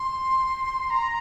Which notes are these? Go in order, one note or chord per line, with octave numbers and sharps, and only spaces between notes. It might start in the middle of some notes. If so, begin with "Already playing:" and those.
Already playing: C6
A#5